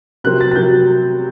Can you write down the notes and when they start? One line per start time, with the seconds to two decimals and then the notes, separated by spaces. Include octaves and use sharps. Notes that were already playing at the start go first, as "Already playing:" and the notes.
0.24 C3 F#3 C4 F#6
0.41 A6
0.51 A6
0.56 C3 F#3 C4 G6